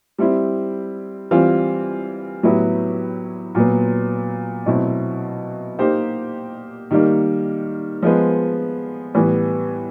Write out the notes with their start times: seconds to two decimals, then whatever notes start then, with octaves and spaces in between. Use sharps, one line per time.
0.18 G3 C4 E4
1.31 E3 G3 C4 F4
2.43 A2 F#3 B3 E4 G4
3.55 A#2 F#3 B3
4.66 B2 F#3 A3 C4 E4
5.78 A#3 D#4 G4 C5
6.91 D#3 G3 A#3
8.02 F3 G#3 B3
9.14 A2 E3 G3 B3